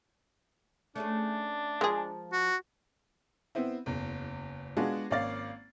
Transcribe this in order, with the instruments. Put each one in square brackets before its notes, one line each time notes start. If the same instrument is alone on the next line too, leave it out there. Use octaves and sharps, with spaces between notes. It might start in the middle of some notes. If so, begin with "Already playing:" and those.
[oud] A3 C#4 G#4 [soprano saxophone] D4
[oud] F3 A#4 [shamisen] G#3 G#4
[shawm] F#4
[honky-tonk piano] B3 C4 E4
F#1 E2
G#3 B3 D4 F4 F#4 G#4
G#1 A#3 C#4 D5 F5 A6